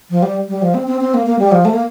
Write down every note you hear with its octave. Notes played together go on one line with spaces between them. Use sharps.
F3
G3
G3
F3
C4
C4
C4
A#3
A#3
G3
F3
A3
A#3